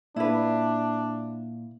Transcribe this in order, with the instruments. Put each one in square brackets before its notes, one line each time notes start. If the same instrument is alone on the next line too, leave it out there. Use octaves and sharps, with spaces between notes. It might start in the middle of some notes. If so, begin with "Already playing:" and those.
[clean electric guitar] A#2 [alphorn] D4 [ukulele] E4 B4